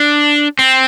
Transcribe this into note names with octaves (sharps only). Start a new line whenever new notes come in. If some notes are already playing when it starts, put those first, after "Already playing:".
Already playing: D4
C4